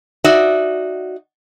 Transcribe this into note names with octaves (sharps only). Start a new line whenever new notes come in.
D#4 F#4 D5 E5